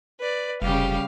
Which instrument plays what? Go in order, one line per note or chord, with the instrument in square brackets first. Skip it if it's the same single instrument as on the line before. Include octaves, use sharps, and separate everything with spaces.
[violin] B4 D5
[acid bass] F1 [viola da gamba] C#3 G3 [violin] G4 F5